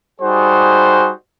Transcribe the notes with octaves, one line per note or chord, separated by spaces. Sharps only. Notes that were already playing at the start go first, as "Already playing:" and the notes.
G3 D#4 F#4 G#4 C5